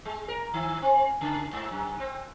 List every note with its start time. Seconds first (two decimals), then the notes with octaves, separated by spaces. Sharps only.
0.05 G#3
0.28 A#4
0.54 D#3
0.82 C4
1.21 C#3
1.53 G#2
1.71 F#2
2.00 C4